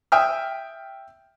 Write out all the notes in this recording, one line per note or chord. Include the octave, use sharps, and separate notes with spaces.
E5 G5 D#6 F6